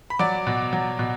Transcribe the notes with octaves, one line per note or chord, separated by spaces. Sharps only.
B5
F#3 D5 D6
B2
F#3
B2